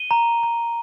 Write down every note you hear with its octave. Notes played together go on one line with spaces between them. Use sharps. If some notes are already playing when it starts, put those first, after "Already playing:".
Already playing: D#7 G7
A#5
A#5